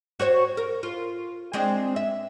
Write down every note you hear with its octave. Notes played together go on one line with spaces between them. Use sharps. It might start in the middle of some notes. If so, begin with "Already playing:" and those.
F#4 C5 C#5
A#4
F4
G#3 C4 D4
E5